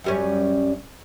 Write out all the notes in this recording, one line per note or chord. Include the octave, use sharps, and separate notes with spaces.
F#2 G3 C#4